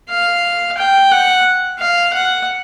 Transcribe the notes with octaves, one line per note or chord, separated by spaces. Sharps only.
F5
G5
F#5
F5
F#5